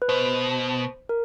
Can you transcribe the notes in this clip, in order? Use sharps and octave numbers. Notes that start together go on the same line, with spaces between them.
B4
B2 C5
A#4